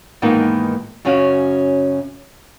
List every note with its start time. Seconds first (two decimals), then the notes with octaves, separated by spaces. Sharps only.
0.22 E2 G#2 D#3 A#3 B3 D#4
1.05 F#2 C#3 C#4 F#4 F5